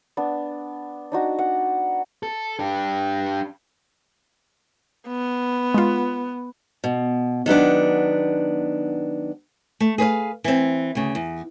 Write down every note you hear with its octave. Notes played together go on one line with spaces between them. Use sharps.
B3 D4
D4 D#4 F#4
F#5
A4
D4 G4
B3
G#3 F4
B2
D#3 F#3 B3 D4
A3
G#4 B4 C#5 F5
E3 C4
D2 C#3
E2